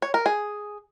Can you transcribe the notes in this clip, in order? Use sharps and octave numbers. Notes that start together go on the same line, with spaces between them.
C#5
A#4
G#4